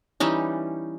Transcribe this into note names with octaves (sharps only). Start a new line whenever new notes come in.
E3 G3 C#4 D#4